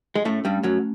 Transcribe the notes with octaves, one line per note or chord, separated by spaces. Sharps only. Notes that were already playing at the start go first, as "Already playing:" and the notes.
G#3
A2 A3 C#4
G2 G3
A3
F#2 F#3